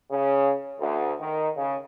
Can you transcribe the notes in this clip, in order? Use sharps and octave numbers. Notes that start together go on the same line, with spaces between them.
C#3
D2
D#3
C#3